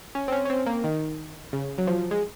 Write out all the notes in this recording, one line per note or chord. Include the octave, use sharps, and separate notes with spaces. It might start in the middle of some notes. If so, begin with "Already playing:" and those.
C#4
C4
C#4
C#4
C4
A#3
D#3
C#3
F#3
F3
G#3